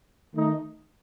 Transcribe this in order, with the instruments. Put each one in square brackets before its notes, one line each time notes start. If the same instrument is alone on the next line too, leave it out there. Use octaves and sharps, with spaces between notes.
[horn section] D#3 A3 D#4